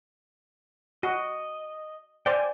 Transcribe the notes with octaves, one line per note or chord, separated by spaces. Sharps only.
F#4 D#5
C5 D5 G5 G#5